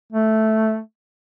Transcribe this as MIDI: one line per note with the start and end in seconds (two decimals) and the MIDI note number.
0.13 0.80 57